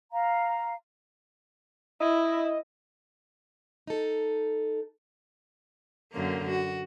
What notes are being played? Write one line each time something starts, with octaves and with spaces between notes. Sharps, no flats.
F5 A#5
E4 D#5
D#4 A4
F#2 D3 A#3
F#4